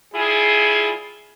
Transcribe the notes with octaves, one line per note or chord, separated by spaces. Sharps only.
G3 E4 F4 G#4